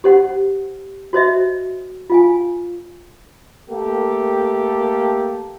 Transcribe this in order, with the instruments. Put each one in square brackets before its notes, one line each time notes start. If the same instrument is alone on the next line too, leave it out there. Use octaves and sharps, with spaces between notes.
[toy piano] G4 C5 F#5
F#4 C5 D#5 E5
F4 F5 G#5
[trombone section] A3 A#3 G4 A4